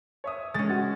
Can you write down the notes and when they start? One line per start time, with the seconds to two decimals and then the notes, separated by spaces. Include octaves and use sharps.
0.24 C#5 E5 D#6
0.54 G#3 C#4 A6
0.70 F#4